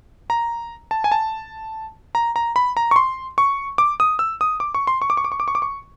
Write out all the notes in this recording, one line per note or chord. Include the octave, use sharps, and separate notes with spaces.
A#5
A5
G#5
A5
A#5
A#5
B5
A#5
C#6
C6
C#6
D6
D#6
E6
D#6
D6
C#6
C6
C#6
D6
C#6
D6
C#6
D6
C#6
D6
C#6